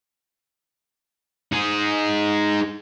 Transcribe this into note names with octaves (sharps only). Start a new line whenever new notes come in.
D#4 G#4